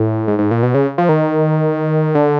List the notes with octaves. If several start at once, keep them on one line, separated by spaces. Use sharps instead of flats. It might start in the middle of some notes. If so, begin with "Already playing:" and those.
Already playing: A2
G#2
G#2
A#2
B2
C#3
F3
D#3
D3